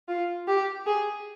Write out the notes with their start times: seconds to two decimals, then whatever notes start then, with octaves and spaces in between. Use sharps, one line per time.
0.08 F4
0.47 G4
0.87 G#4